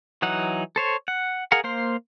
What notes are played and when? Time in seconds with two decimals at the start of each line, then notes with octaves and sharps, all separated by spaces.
0.22 E3 F#3 D#4 F#5
0.76 A4 C5 C#5
1.08 F#5
1.52 G#4 A#4 F5 F#5
1.64 A#3 C5 F5 C6